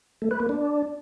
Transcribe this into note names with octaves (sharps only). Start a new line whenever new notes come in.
A3
B4
A#3
D4